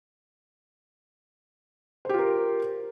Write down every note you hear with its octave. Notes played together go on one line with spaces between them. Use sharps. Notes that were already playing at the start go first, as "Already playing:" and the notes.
F4 G4 A#4 C5